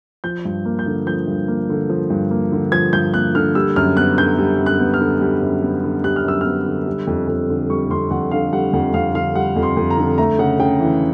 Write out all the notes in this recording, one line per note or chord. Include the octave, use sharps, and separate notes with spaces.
F3 G6
G2
A#3
G6
D3
F3 G6
G2
A#3
D3
F3
G2
A#3
D3
F3 G#6
G2 G6
A#3 F#6
D3 F6
G3 E6
F#2 F6
B3 F#6
D3 G6
G3
F#2
F#6
B3
F6
D3
G3
F#2
B3
D3
G3 F#6
F6
F#2 E6
B3 F6
D3
G3
F2
F2
D3
G3 C#6
F2 C6
F2 F#5
D3 F5
G3 F#5
F2 F#5
F2 F5
D3 F5
G3 F#5
F2
C6
F2
A#5
D3
A3 A#5
C#3 F#5
C#3 G5
E3